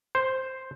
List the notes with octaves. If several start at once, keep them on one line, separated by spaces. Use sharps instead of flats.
C5